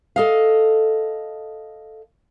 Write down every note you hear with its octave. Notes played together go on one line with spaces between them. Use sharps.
A4 D#5 F5